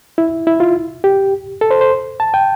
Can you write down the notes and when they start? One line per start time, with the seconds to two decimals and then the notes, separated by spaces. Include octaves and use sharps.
0.18 E4
0.47 E4
0.60 F4
1.04 G4
1.61 A4
1.71 C5
1.81 C5
2.20 A5
2.34 G5